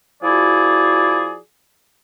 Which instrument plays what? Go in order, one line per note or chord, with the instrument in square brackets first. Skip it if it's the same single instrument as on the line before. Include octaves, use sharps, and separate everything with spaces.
[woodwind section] F3 E4 F#4 G#4 D5